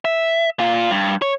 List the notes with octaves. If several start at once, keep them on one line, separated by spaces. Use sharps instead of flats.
E5
A#2 F4
G2
C#5